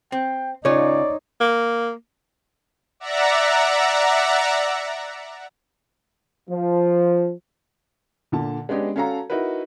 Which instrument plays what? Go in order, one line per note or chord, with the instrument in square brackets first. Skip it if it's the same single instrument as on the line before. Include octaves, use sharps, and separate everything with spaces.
[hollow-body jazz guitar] C4 [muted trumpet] G5
[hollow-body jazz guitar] C#3 F4 [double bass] D#4 [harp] C#5 [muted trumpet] D5
[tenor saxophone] A#3
[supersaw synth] D5 E5 F#5 A#5
[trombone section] F3
[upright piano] A#2 D3 A5
G#3 B3 C#4 D4 G4 D#5
C#4 F#4 A4 F5 A5 A#5
D#4 E4 F#4 A#4 B4